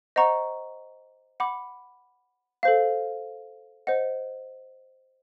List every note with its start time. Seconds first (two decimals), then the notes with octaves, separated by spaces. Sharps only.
0.16 C5 D#5 F#5 A#5 C#6
1.40 F#5 B5 D6
2.63 A4 C5 F5
3.87 C5 D#5 F#5